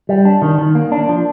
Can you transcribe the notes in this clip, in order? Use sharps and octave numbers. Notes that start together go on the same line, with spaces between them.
G3
D4
D#3
D#3
A#3
D4
F3